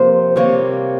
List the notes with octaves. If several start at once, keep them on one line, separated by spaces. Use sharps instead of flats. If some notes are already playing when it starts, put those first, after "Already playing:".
Already playing: C3 F3 A#3 C5
C3 G3 A#3 C#5